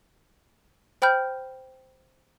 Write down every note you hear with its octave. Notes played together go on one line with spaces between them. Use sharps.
C5 G5 B5 F6 G6